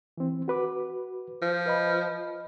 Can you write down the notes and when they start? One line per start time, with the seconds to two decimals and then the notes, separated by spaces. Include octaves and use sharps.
0.17 E3 C4
0.48 F#4 B4 D6
1.42 F3
1.66 B4 D#5 B5